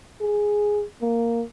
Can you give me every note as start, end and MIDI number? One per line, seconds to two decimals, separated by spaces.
0.21 0.84 68
1.02 1.43 58